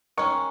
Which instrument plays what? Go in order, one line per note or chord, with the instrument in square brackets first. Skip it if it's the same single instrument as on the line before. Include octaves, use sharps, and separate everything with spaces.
[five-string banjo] D#3 G#3 C#4 [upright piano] C#6